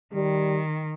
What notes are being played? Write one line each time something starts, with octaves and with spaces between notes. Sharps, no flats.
D#3 G3